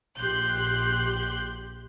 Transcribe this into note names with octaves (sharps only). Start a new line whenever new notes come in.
A#1 G4 C6 F#6 G6